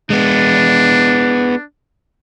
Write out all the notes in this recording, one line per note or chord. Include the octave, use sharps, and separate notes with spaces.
G#3 B3 D4